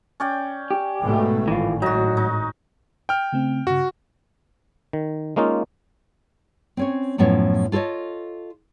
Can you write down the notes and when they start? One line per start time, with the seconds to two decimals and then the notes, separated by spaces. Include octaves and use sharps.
0.20 C#4 D5 G5
0.71 G4
1.02 G#2 B2 A3
1.48 G#1 A2 E3 F4
1.82 F#3 D#4 F#4
2.17 D#4
3.09 G5 F6
3.33 C#3 A3 C4
3.67 G2 C#3 F#4
4.93 D#3
5.36 G#3 A#3 C#4 D#4 F4
6.77 C4 C#4 C#5
7.18 F#2 A2 F3 B3 C#4
7.72 F4 A4 A#4 C#5 D#5